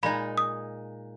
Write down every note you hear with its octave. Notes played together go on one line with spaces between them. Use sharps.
A#2 G#3 D#4 B5
D#6